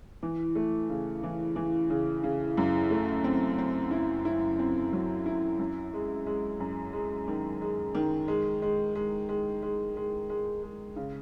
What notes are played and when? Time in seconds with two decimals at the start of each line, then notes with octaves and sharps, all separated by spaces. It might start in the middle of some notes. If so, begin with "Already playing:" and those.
0.23 E3
0.55 A3
0.89 C#3
1.23 E3
1.56 E3
1.90 C#3
2.23 C#3
2.57 F#2
2.90 A3
3.24 C4
3.58 C4
3.91 E4
4.25 E4
4.59 C4
4.93 F#3
5.26 E4
5.59 F#2
5.94 G#3
6.26 G#3
6.60 F#2
6.93 G#3
7.28 D#3
7.62 G#3
7.95 D#3
8.28 G#3
8.62 G#3
8.95 G#3
9.29 G#3
9.63 G#3
9.97 G#3
10.30 G#3
10.63 G#3
10.96 C#3